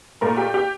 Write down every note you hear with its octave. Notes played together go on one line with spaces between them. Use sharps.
A#2 A3 A#4 A#5
G4 G5
G4 G5